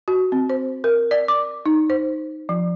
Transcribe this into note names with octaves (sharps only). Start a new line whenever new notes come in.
F#4
C4
C5
A#4
D5
D6
D#4
C5
F3